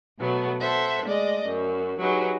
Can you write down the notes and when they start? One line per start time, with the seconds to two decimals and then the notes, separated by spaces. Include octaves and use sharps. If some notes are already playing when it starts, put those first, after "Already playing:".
0.19 B2 F#3 A3 B3
0.60 A4 C5 E5 F#5
1.06 G#3 A3 D5 D#5
1.46 F#2
2.00 F#3 D#4 G4 G#4 B4